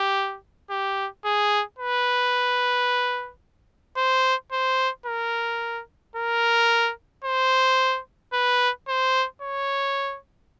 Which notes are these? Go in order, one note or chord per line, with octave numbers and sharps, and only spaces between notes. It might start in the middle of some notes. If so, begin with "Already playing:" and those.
Already playing: G4
G4
G#4
B4
C5
C5
A#4
A#4
C5
B4
C5
C#5